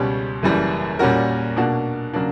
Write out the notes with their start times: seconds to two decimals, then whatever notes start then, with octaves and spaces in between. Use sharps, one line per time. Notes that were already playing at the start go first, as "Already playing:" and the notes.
Already playing: C#2 B2 G3 C#4 G4
0.43 F#1 F#2 E3 G3
0.99 A#2 G3 C#4 F#4 A#4
1.56 B2 A#3 D4 F#4
2.14 C#3 F#3 A#3 D4